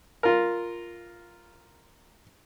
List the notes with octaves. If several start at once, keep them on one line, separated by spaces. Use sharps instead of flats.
F4 A#4